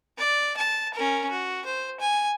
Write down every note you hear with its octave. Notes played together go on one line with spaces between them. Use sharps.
D5
A5
C#4 A#4
F#4
C5
G#5